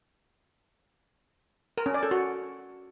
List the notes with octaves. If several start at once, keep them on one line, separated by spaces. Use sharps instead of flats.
A#4
C#4
D5
A4
F#4